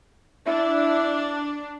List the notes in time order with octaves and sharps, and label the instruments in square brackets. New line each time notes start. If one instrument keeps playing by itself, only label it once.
[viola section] D4 [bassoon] E4